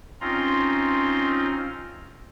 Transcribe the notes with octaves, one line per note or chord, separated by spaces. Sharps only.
C4 C#4 D#4 F4 A#5 C6